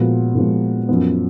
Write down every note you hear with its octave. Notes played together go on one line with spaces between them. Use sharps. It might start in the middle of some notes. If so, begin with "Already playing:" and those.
Already playing: A#2 F3 G#3 B3 F#4
A#2 F3 G#3 B3
F#2 F3 B3